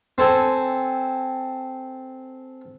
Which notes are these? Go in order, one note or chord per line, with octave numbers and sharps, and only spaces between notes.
C4 A4 G#5